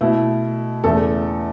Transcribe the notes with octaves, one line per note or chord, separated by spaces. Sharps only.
B2 A3 E4
E2 C#3 A3 A4